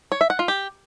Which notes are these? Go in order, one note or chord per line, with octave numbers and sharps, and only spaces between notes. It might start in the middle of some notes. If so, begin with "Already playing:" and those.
C#5
E5
F#5
F4
G4